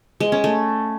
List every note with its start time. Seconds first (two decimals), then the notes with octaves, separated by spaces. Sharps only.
0.20 G#3
0.32 C#4
0.44 A3